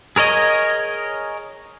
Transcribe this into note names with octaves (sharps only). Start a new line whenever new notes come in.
G#4 A#4 C#5 D#5 D#6